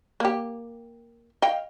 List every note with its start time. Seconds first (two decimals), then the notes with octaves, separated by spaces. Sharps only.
0.20 A#3 G4
1.42 D#5 F5 G5